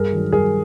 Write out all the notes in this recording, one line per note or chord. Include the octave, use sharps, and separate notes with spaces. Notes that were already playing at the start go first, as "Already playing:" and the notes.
Already playing: G2 G#4 A#4
D#3 F#3
G2 G#4 A#4